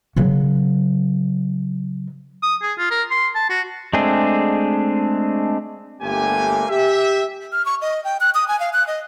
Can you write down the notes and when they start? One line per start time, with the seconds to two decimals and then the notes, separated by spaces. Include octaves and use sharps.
0.16 C#3 F#3
2.43 D#6
2.62 G#4
2.78 F4
2.91 A#4
3.11 C6
3.35 A5
3.50 F#4
3.93 G#3 A3 C4 D4 G#4
6.01 G1 G2 A3 A#3 G4 G#5
6.69 G4 E5
7.52 F6
7.66 C#6
7.81 D#5
8.04 G5
8.21 F#6
8.35 D#6
8.48 G#5
8.60 F5
8.73 F#6
8.87 D#5